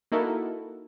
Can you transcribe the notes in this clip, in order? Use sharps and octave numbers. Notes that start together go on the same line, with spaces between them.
A#3 D#4 E4 F#4 A4 A#4